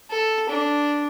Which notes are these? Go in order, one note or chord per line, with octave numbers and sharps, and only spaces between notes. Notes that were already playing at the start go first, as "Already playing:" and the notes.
A4
D4